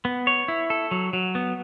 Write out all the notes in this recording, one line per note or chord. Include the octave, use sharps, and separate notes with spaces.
B3
C#5
E4
A4
F#3
F#3
B3